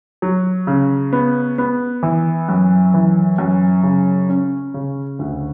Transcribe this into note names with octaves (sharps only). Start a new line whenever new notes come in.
F#3
C#3
B3
B3
E3
F#2
E3
F#2
C#3
C#4
C#3
D2